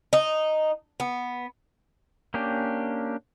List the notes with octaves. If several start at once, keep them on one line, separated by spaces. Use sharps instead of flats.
D#4
B3
A#3 C#4 D4 G4